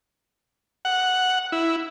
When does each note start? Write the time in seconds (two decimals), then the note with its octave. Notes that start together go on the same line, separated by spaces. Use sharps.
0.85 F#5
1.52 E4